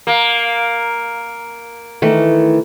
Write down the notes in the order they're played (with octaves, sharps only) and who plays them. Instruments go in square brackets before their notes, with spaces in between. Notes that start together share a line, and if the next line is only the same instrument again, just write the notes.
[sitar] A#3
[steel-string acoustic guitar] D#3 E3 A3